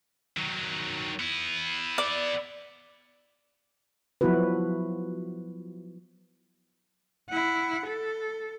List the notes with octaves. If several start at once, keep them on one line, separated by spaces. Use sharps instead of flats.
D#3 F#3
B3 E4
D5
F3 F#3 B3 E4 F#4 B4
E4 F#5
A4